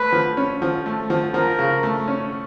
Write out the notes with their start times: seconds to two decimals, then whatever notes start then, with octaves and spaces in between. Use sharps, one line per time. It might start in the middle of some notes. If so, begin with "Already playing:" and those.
Already playing: A3 B4
0.12 F3
0.37 C#4
0.62 F3
0.86 A3
1.10 F3
1.34 F3 A#4
1.59 C#3
1.83 A3
2.08 C#4